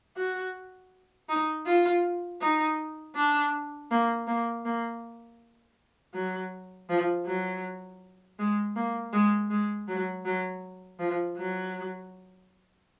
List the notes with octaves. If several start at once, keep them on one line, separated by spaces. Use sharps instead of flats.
F#4
D#4
F4
D#4
D4
A#3
A#3
A#3
F#3
F3
F#3
G#3
A#3
G#3
G#3
F#3
F#3
F3
F#3